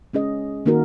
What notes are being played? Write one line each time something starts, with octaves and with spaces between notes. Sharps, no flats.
G#3 C#4 G#4 D#5
D#3 A#3 D#4 F#4 A#4